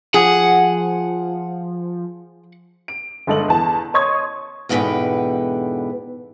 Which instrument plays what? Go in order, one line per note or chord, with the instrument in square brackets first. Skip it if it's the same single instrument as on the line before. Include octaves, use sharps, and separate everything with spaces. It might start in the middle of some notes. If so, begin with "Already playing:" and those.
[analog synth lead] F3 [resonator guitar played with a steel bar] G#4 [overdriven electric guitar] F#5
[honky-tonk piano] D7
G1 G#3 A4 D#5 F#7
E2 A5
C#5 D#5 C6 C#6 D#6 G#6
[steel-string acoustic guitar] E2 G#2 B2 D3 B4 G5